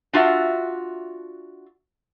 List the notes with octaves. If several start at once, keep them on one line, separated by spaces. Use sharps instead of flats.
D4 F4 F#4 E5